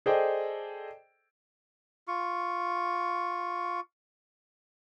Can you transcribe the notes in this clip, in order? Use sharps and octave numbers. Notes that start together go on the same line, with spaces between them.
G#4 A4 C5 D5 D#5 G5
F4 C#6